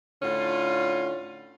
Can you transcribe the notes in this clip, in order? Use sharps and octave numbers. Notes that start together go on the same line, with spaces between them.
A2 D3 C#4 F4